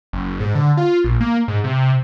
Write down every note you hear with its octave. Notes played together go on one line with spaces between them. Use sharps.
F#1
G#2
D3
F4
A#1
A#3
G#2
C3